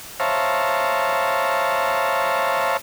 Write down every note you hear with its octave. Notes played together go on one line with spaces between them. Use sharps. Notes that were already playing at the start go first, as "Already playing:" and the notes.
C5 C#5 E5 F5 A5 A#5